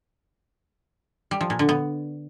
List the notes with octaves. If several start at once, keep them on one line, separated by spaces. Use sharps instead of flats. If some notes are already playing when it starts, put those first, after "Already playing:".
G3
F3
A#2
D3
B3